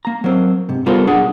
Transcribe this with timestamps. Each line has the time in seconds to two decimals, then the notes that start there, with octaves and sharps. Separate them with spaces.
0.05 A#3 A#5
0.24 F#3 A#3 C4
0.69 G#2 C3
0.86 G3 B3 F4 A4 A#4 C5
1.07 B1 D4 G#4 F#5